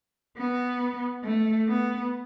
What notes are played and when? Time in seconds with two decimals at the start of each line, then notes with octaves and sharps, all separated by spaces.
0.37 B3
1.24 A3
1.68 B3